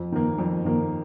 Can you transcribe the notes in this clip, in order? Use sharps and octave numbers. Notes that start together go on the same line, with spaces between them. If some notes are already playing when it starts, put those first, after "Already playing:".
Already playing: F2
D#3 A#3
F2
D#3 A#3